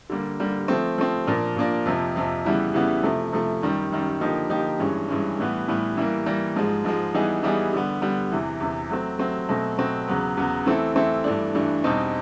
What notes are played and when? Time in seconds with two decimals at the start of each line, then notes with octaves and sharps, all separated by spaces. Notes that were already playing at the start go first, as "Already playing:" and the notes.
0.10 D3 G3 A#3
0.40 D3 G3 A#3
0.68 F3 A3 C4
0.98 F3 A3 C4
1.27 A#2 F3 A#3 D4
1.56 A#2 F3 A#3 D4
1.86 F2 C3 F3
2.16 F2 C3 F3
2.45 C#3 E3 G3 B3 E4
2.74 C#3 E3 G3 B3 E4
3.03 C3 F3 A3
3.32 C3 F3 A3
3.62 F#2 D#3 G3
3.92 F#2 D#3 G3
4.21 D3 F3 A#3 D#4 G4
4.50 D3 F3 A#3 D#4 G4
4.79 G2 E3 G#3 C#4
5.08 G2 E3 G#3 C#4
5.38 A2 E3 G3 B3
5.68 A2 E3 G3 B3
5.97 E3 G3 A#3
6.26 E3 G3 A#3
6.56 G#2 F3 G#3
6.84 G#2 F3 G#3
7.14 E3 G3 B3 D#4 G#4
7.43 E3 G3 B3 D#4 G#4
7.73 D3 G3 B3
8.01 D3 G3 B3
8.32 E2 C3 E3
8.60 E2 C3 E3
8.90 F#3 A3 C4
9.19 F#3 A3 C4
9.49 B2 F#3 A3 C4
9.78 B2 F#3 A3 C4
10.08 E2 C#3 F#3 B3
10.37 E2 C#3 F#3 B3
10.66 E3 A3 C4 E4 A4
10.95 E3 A3 C4 E4 A4
11.24 G2 E3 A3 D4
11.54 G2 E3 A3 D4
11.84 E2 B2 G3 C4 D#4